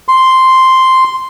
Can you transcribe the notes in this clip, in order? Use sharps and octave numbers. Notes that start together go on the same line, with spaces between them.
C6